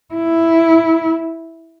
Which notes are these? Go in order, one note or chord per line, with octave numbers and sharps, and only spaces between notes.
E4